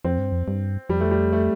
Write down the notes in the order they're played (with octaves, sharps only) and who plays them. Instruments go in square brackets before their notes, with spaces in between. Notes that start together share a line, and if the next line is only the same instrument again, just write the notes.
[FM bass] F2 [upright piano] C4
[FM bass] G2
F2
G2
[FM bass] F2 [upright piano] G3
[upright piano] A3
G3
A3